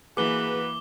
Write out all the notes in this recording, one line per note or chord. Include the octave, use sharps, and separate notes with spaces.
E3 A#3 F#4 G#4 B4 D6 G7